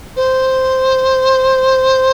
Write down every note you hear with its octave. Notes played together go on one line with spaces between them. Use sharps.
C5